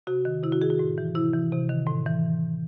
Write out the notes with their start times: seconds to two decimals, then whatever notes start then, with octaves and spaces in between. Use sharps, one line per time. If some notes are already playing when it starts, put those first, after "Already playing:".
0.07 C3 F#4
0.25 D#3
0.43 C3 E4
0.52 F#4
0.61 D#3 G#4
0.70 F#4
0.79 A2
0.98 E3
1.15 C3 E4
1.33 E3
1.52 C3
1.69 D#3
1.87 A2
2.06 E3